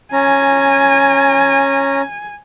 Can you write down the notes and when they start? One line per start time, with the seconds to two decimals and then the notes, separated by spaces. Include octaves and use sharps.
0.13 C#4 G#5 A#5